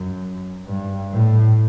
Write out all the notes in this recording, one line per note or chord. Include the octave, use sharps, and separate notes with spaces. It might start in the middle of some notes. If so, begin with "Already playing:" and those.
Already playing: F#2
G2
A2